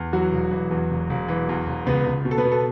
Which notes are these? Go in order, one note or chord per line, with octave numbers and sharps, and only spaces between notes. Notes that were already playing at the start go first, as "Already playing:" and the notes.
Already playing: E2
E3 F#3 F#4
E1
E3
E2
E1
E1
E3
E2
E1
C#2 B3 B4
C#2
B2
A4
B3 B4
B2
A4